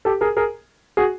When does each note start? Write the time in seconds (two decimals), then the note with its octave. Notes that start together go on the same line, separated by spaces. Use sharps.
0.05 G4 A4
0.21 G#4 A#4
0.37 G#4 A#4
0.97 F#4 G#4